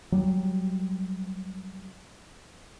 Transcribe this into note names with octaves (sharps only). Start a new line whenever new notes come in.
F#3 G3